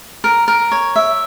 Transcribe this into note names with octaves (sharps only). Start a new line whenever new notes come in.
A#4
A#4
C#5
E5